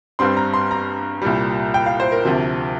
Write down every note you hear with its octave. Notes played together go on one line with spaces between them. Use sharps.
G2 G3 C4 C6
A#5
C6
A#5
C2 A#2 G3
G5
F5
C5
A#4
D2 C3 F3